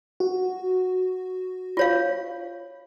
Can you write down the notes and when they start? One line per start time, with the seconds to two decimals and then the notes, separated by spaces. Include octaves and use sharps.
0.20 F#4
1.77 F4 C#5 F5